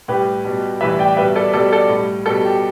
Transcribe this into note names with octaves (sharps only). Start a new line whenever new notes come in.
A2 G3 G4 B4
B2 G3
A2 E3 G3 B4 E5
D5 G5
B2 G3 B4 E5
A4 D5
B2 G3 A4 D5
A4 D5
A2 G3
B2 G3 A4
G4